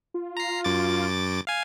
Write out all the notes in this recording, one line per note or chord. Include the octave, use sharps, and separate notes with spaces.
F4
A#5 C7
F#2 D6 A6
F5 G#5